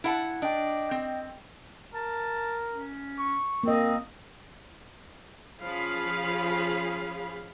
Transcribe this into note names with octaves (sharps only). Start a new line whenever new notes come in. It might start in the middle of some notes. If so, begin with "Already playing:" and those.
E4 F#5 A5
D4 D#5 G5
C4
A#4 A5
C#4
C#6
A#3 C4 D#5
F3 C#4 G#4 F5 B5